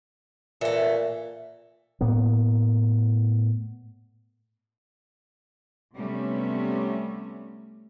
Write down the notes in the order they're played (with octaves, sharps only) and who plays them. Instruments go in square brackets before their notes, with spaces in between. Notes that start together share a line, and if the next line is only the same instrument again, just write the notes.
[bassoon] A#2 [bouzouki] E3 A3
[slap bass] A2 A#3 B3
[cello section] C3 G3 A3 B3 C#4